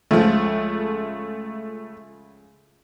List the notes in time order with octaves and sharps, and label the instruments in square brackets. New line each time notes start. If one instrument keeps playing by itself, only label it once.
[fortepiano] C#2 F3 [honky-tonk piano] A3